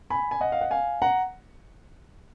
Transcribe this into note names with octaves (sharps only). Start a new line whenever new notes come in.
G#5 B5
G#5
D#5 F#5
F5
F#5
F5 G#5
F#5 A#5